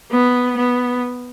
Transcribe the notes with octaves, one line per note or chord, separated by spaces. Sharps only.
B3
B3